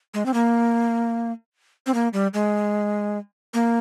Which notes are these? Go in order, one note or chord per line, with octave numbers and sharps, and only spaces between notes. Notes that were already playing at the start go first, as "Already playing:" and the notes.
G#3
C4
A#3
C4
A#3
G3
G#3
A#3